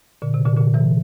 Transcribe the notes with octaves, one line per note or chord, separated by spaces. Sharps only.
A#2 D3
C3
A#2 D3
A#2 D3
C3 E3